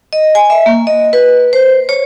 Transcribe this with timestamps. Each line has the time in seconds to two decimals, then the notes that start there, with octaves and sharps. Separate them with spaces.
0.13 D#5
0.35 G#5
0.50 E5
0.66 A#3
0.87 D#5
1.13 B4
1.53 C5
1.89 C#5